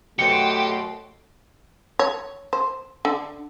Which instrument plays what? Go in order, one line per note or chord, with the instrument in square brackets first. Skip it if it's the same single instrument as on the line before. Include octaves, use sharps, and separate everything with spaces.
[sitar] F#2 B2 C4 [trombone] A3 [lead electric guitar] G4 [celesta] C#7
[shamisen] C#5
C5
D3